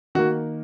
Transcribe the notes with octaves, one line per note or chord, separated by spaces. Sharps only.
D#3 A#3 F#4